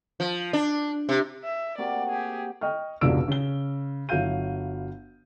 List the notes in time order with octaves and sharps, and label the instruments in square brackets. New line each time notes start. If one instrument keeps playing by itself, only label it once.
[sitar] F3
D4
C3
[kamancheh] E5
[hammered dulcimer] C3 A#3 F#4 [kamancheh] D5
[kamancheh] G4 G#4
[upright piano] D#5 G5 C#6 F6
F1 C#2 B2 D4 E6 D7
C#3 G7
G1 F#3 E4 F5 G6 D#7